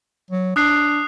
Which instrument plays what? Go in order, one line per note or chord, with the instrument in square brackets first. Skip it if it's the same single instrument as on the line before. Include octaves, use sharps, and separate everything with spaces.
[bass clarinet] F#3
[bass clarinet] D4 [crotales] D#6 F#6 C7